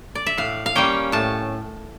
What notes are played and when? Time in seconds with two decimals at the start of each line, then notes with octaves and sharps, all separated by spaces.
0.15 D5
0.26 E5
0.38 A2 F5
0.66 F5
0.75 G3 A#3 C#4 G5
1.12 A2 A5